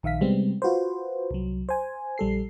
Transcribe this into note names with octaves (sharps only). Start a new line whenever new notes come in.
A#1 D#3 E5 F5 B6
C3 G3 G#3 B3 C4
F4 F#4 B4 C5
C2 F#3
C5 G#5
A#1 G3 A4 C7